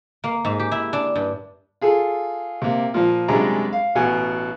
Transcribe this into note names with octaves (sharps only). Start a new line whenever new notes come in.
A#3
G#2
G4
E4
D4
G2
F4 G#4 A4
C3 A#3
A#2 F3
F#2 C3 G3 G#3 D4 A#5
F5
A1 B2 F#5 G#5